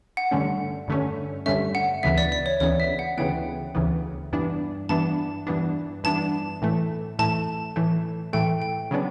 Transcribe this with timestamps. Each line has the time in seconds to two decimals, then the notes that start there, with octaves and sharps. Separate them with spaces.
0.17 F#5
0.31 G2 D3 A3 C#4
0.88 G2 D3 A3 C#4
1.46 G2 D3 A3 C#4 E5
1.75 F#5
2.03 D2 C#3 E3 B3 E5
2.18 D5
2.32 D5
2.46 C#5
2.60 D2 C#3 E3 B3 C#5
2.80 E5
2.99 F#5
3.18 D2 C#3 E3 B3 G5
3.75 D2 C#3 E3 B3
4.33 G2 E3 B3 D4
4.89 G2 E3 B3 D4 A5
5.47 G2 E3 B3 D4
6.04 G2 E3 B3 D4 A5
6.62 A2 E3 A3
7.19 A2 E3 A3 A5
7.76 A2 E3 A3
8.33 A2 E3 A3 G5
8.62 G5
8.91 C#3 F#3 B3 D4